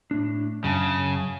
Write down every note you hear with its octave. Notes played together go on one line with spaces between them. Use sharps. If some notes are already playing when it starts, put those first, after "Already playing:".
A2 D4
F#2 C#3 A5